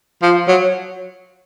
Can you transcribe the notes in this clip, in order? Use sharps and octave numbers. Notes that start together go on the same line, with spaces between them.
F3
F#3